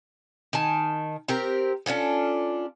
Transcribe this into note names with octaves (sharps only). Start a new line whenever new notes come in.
D#3 G#5 A5
C4 G4 A#4
C#4 D4 F4 A4